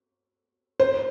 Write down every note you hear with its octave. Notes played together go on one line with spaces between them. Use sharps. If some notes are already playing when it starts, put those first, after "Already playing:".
C5